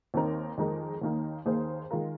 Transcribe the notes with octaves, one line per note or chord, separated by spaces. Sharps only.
D#2 D#3 C4 D#4 A#4
F2 D#3 G#3 D#4 A#4
D#2 D#3 A#3 D#4
D#2 D#3 A#3 G#4 C5
D#3 G#3 F4 A#4